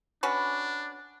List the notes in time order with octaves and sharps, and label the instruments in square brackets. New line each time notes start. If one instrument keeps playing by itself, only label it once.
[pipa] C#4 F#4 B4 [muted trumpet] D4